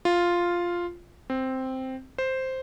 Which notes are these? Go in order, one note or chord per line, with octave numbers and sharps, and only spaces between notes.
F4
C4
C5